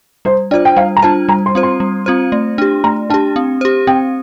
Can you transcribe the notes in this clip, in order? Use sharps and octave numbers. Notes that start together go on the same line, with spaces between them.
G3 C5
D4 F4 C5 D5
G5
G3 F5
A#5
D4 F4 C5 A5
G3 A#5
C6
C4 F4 C5
C6
G3
C4 F4 C5
A3
D4 G4
A3 A#5
D4 G4 A5
C4
G4 C5
C4 G5